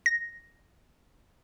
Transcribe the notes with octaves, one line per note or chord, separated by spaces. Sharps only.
A#6